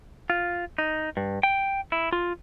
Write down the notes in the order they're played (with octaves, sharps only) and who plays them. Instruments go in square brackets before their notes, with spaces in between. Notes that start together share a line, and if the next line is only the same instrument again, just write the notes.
[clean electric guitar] F4
D#4
G2
G5
E4
F4